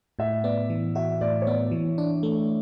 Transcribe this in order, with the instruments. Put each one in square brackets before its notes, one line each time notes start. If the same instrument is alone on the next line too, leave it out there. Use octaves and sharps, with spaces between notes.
[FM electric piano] A2 [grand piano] E5
[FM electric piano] B3 [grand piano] D5
[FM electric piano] E3
[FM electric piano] F#4 [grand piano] E5
[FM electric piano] A2 [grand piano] D5
[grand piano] C#5
[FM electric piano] B3 [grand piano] D5
[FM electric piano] E3
D4
A3